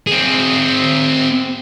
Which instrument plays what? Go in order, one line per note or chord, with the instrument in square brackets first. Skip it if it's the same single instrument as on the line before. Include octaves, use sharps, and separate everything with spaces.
[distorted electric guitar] C4 G#4